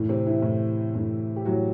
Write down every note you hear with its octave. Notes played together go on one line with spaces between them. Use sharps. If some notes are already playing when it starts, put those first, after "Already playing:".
Already playing: A2 E3
C3 C4
E3 E4
A2 E3
A2 E3
G4
A2 E3 F#3 F#4